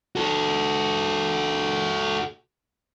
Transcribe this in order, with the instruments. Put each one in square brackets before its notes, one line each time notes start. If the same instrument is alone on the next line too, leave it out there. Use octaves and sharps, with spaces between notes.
[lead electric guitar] F#4 A4